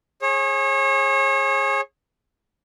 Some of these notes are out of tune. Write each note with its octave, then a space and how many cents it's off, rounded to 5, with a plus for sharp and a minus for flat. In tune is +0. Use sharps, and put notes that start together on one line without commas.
G#4 +0 C#5 -35